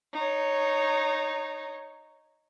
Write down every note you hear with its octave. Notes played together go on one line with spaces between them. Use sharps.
D#4 C#5